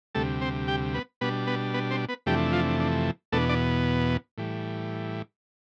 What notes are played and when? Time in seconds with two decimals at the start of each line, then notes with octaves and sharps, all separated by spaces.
0.15 D2 C3 G3 A3 A4
0.41 C4 C5
0.68 G4 G5
0.94 B3 B4
1.21 B2 G3 B3 D4 B4
1.47 B3 B4
1.74 B3 B4
1.91 C4 C5
2.08 B3 B4
2.26 F2 C3 E3 G3 A3 D4 G4
2.52 F3 F4
2.80 D4
3.32 E2 B2 A3 B3 D4 A4
3.49 D4 D5
4.38 A2 E3 G3